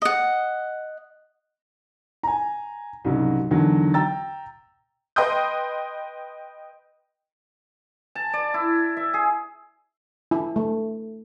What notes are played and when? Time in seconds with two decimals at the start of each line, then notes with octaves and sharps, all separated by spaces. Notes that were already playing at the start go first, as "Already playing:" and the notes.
0.02 D#5 F#5
2.23 G#5 A#5
3.04 C2 G#2 C#3 F#3
3.51 E2 D3 D#3 F#3
3.94 G5 A#5 E6 A6
5.16 B4 D#5 G5 C6 D#6 G6
8.15 A5
8.33 D5
8.54 E4
8.97 E5
9.14 G#4
10.31 E4
10.56 A3